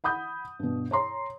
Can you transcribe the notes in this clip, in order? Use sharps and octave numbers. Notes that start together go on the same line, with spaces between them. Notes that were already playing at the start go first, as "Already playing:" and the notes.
F#5 B5 D#6 G6
G2 B2
C#5 A#5 C6